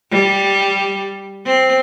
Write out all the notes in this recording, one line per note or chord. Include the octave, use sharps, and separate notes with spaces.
G3
C4